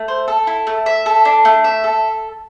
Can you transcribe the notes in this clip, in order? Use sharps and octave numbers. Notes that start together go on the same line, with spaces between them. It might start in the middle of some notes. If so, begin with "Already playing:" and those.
Already playing: A3
C5
A4
E4
A3
E5
A4
D4
A3
E5
A4